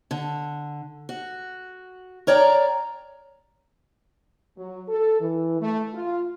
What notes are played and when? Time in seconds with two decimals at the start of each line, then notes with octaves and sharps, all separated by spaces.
0.11 D3
1.09 F#4
2.27 A#4 C#5 D5 G5 A#5
4.58 F#3
4.89 A4
5.20 E3
5.61 A3
5.94 F4